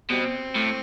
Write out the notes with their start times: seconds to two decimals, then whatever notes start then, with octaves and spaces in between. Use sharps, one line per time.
0.10 B2 G3 C4
0.55 A2